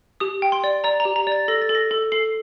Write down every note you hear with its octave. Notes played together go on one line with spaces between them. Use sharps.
G4 D#6
G5
C6
D5
D5 A#5
A#5
G4
A#5
D5 A6
A4 A#6
A6
A4
A#6
A4
A4 C7